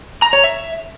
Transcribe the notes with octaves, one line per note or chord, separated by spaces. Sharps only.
A#5
C#5
E5